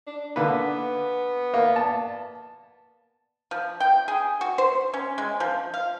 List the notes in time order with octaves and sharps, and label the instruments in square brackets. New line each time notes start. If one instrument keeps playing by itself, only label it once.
[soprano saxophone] D4
[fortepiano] D3 A#3 B4 [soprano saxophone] B3
[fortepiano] A#3
A5
[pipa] F3
G5
G#4
F#4
C5
C#4
G#3
F3
F5